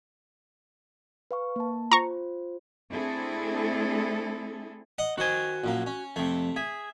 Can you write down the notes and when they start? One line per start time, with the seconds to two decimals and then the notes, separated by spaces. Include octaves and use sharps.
1.31 B4 F5 C#6
1.56 A#3 A5
1.92 F4 C5 A#5 C#6
2.92 A3 C4 D4 E4 G#4 A4
4.98 D#5 F#5
5.18 D#3 F#4 C5 G#5
5.64 A#1 F#2 A#3
5.86 C#4
6.16 F2 C3 A3
6.56 G#4 E5